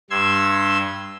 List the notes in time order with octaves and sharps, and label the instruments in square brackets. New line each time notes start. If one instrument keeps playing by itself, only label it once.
[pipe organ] G2 C6 E6 G#6